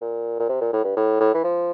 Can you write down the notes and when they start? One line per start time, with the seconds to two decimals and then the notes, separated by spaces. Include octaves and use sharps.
0.01 A#2
0.39 A#2
0.49 C3
0.61 A#2
0.73 A2
0.84 G2
0.97 A2
1.21 A2
1.34 E3
1.44 F3